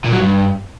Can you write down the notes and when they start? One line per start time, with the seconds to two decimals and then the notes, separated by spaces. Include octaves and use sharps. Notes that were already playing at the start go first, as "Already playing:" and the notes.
0.04 A#2
0.12 F#3
0.20 G2